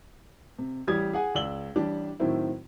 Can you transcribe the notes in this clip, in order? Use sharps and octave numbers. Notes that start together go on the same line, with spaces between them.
C3
A1 G3 G4 D#6 G#6
G#4 F#5 G#5
C#2 D5 E6 F#7 G7
A1 G3 D4 G4
A2 D#3 F#3 C4 E4